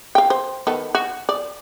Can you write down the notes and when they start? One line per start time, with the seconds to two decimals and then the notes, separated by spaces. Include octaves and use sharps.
0.15 F5 G5
0.30 C5
0.67 D#3 B3 A4
0.95 F#4
1.29 D5